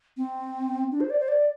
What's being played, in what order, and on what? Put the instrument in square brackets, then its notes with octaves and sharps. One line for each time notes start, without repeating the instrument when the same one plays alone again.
[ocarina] C4
D4
C5
D5
C5
D5